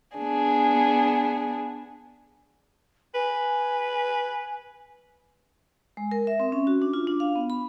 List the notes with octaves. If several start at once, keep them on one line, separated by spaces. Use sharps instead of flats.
B3 D4 G#4
B4 G#5
G#3
A#4
E5
C4
C#4
F#4
D4
F4
D4
F5
B3
B5